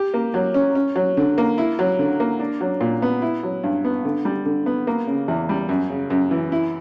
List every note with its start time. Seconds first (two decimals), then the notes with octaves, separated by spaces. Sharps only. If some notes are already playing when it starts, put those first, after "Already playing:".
Already playing: G4
0.14 A#3
0.34 F#3
0.54 C#4
0.75 C#4
0.96 F#3
1.17 D3
1.38 A#3
1.58 E4
1.79 F#3
1.99 D3
2.20 A#3
2.39 D4
2.61 F#3
2.81 A#2
3.02 B3
3.22 E4
3.43 F#3
3.64 G2
3.85 B3
4.05 D3
4.25 G3
4.46 D3
4.66 B3
4.87 A#3
5.07 C#3
5.28 E2
5.49 G3
5.69 F#2
5.90 C#3
6.10 F#2
6.31 E3
6.52 E4